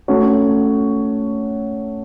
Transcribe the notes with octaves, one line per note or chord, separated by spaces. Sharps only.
A3 C#4 F#4 C#5